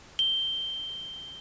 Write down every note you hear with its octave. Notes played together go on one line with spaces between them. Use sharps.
G7